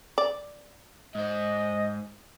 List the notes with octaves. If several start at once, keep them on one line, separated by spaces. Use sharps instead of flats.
D5
G#2 C5 D#5